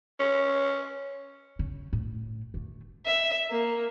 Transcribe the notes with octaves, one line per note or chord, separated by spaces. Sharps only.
C#4
C#3
A2
D3 A3
E5
A#3